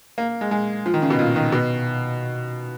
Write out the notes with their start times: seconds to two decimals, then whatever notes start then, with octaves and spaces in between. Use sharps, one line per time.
0.18 A#3
0.41 G#3
0.51 G#3
0.86 F3
0.94 D#3
1.02 C#3
1.10 B2
1.19 A#2
1.36 D#3
1.52 B2